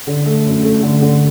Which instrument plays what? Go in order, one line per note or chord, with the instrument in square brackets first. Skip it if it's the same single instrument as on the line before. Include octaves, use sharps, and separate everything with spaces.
[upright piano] D3
A3
F#2
A3
D3
D3